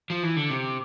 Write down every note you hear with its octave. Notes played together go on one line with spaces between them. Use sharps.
F3
E3
D3
C3